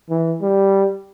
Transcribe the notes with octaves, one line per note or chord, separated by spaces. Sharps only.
E3
G3